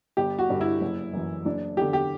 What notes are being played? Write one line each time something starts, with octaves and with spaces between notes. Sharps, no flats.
G1 G4
F#4
G2 D3
E4
F#1
F#2 E3
F#1 D4
E2 D3 G4
G4